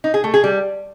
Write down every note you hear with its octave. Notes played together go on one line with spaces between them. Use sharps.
D#4
G#4
A3
G#4
G3